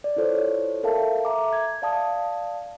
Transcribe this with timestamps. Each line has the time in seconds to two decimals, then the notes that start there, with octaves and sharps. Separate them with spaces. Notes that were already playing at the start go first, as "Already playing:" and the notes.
0.04 D5
0.16 E4 F4 A4 C5 C#5
0.83 A4 A#4 E5 F5 A5
1.25 E5 A#5 D6
1.53 G#6
1.82 D5 F5 A5 D#6